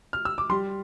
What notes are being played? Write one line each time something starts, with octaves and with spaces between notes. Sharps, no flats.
F6
E6
D6
G3 C6